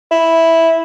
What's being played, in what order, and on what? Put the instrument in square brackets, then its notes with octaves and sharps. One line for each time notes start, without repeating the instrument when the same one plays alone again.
[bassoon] E4